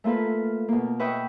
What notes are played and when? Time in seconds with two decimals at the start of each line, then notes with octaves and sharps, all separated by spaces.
0.04 A3 A#3 F4 A4 B4
0.68 B2 A#3
1.00 B4 D#5 E5 G5 C#6